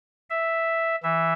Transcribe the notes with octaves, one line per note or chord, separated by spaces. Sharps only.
E5
E3 E5